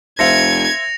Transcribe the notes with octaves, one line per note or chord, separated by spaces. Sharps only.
F1 C5 E5 F5 G#6 A#6 C#7 F7